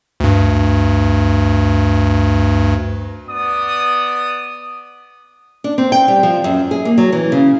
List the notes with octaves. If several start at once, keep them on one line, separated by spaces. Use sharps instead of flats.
D2 G2
B3 D5 D#6
D4
C4
G5
G3
F3
F#2
G#4
A#3
F#3
E3
C#3